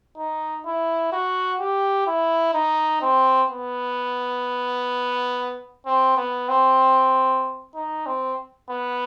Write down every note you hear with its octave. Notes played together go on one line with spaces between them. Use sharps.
D#4
E4
F#4
G4
E4
D#4
C4
B3
C4
B3
C4
D#4
C4
B3